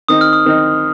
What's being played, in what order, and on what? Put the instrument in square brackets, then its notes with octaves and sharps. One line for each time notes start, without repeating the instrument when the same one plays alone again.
[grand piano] D#3 C4 D#4 [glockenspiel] D#6
[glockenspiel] F6
D#6
[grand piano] D#3 C4 D#4